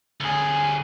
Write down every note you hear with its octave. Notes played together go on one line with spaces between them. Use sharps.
D2 G#4